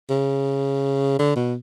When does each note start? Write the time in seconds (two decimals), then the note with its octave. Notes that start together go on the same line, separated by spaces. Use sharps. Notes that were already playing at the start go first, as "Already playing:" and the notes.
0.10 C#3
1.19 D3
1.36 B2